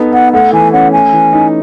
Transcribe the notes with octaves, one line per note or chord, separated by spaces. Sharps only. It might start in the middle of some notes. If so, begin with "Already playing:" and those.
Already playing: B3 D#4 A4
B3 F#5
A3 F#5
E3 G#5
C#4 F#5
A3 G#5
E3
D#4